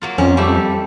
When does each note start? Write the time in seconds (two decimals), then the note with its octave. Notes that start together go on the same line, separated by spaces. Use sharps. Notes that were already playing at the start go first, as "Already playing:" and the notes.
0.02 F#3 A#3 F4
0.18 F2 C#4
0.37 G3 A3 G4 E5